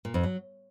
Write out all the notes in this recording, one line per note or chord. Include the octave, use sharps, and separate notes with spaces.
A#2
F2
F#3